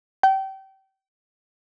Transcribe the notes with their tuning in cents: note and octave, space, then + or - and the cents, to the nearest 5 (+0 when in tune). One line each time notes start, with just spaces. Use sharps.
G5 -30